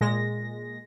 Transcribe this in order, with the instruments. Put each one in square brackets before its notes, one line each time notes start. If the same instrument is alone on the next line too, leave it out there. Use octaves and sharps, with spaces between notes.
[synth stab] A#2 G#3 A#6